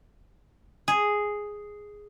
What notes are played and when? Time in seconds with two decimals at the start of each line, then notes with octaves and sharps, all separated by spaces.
0.88 G#4